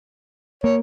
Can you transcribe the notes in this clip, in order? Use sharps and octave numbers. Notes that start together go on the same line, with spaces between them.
A#3 C#5